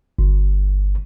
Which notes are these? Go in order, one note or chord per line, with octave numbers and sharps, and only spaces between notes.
G1